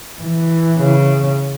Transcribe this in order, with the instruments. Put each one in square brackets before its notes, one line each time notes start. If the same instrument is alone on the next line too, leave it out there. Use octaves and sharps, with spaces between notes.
[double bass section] E3
[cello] C#3